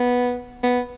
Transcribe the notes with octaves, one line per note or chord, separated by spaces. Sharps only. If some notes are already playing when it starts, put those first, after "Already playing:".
Already playing: B3
B3